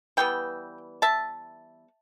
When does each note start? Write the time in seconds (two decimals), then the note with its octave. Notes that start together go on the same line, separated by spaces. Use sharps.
0.17 E3 G3 B3 G5
1.02 E5 A5